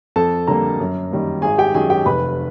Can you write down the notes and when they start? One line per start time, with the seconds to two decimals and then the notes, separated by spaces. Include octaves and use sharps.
0.16 F2 A4 A5
0.47 D3 G3 A#3 A#4 A#5
0.80 F#2
1.11 D#3 G3 A#3
1.42 G#1 G#4 G#5
1.58 G4 G5
1.74 F#2 D#3 F#3 G#4 G#5
1.90 G4 G5
2.05 F1 B4 B5